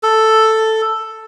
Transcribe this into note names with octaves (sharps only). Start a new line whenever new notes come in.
A4